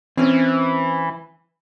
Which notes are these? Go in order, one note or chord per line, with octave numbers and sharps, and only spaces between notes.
E3 C4 C#4